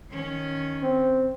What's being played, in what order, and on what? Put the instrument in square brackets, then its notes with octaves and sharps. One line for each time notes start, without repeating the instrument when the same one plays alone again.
[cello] D#3 C#4
[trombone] C4